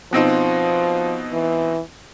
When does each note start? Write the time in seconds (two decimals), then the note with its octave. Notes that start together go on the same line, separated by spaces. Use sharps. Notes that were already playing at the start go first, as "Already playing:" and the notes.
0.13 B2 F3 C4 D#4
1.32 E3